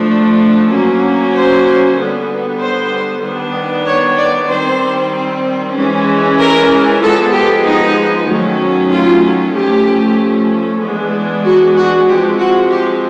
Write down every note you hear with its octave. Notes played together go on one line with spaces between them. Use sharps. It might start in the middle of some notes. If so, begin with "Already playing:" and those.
Already playing: F3 A3 D4
F#3 A#3 C#4
C5
D3 G3 B3
C5
D#3 G3 B3 D4
C#5
D5
D#3 G3 C4 C5
E3 G#3 C#4
A#4
F3 G#3 B3 A4
G4
D#4
D#3 F#3 A3 C#4
F4
F3 A3 C#4 G4
E3 G#3 B3 D4
F#4
F#4
F3 G#3 C4 G4
F#4
G4